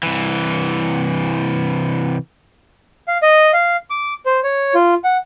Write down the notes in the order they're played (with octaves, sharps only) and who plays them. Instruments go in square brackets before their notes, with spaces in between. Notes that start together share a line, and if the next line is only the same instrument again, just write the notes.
[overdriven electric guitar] C2 E3
[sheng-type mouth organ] F5
D#5
F5
D6
C5
C#5
F4
F#5